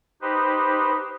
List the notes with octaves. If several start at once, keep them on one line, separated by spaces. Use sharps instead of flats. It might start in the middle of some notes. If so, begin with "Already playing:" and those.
D#4 G4 B4 C5